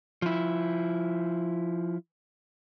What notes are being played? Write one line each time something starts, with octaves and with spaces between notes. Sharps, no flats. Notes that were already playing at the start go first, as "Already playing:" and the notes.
F3 E4